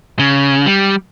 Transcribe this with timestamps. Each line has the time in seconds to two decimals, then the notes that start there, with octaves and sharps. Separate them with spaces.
0.19 C#3
0.66 G3